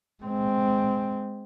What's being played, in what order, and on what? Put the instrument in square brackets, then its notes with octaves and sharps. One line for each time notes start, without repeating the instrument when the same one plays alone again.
[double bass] G#3 C4